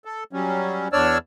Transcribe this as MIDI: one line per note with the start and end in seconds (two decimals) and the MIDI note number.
0.05 0.24 69
0.33 0.88 54
0.33 0.88 55
0.33 0.88 61
0.93 1.18 40
0.93 1.18 62
0.93 1.18 73
0.93 1.18 74
0.93 1.18 88
0.93 1.18 89